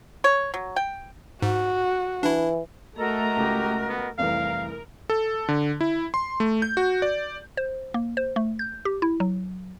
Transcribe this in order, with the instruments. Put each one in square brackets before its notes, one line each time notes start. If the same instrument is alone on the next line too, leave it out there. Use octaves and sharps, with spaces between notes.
[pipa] C#5
F#3
G5
[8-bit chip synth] G#2 [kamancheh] F#4
[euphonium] E3 [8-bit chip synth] D4 E4
[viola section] A3 A#5 [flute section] F#4 A#4 D#5 [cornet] A4
[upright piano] C#2 [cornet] G4
[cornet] B3
[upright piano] F1 C2 E3 [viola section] A#4 [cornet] F5
[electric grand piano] A4
D3
E4
C6
A3
G6
F#4
D5
[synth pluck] C5
A#3
C5
A3
G6
G4
E4
F#3